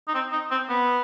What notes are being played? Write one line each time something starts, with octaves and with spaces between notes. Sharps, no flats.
D#4
C4
D#4
C4
B3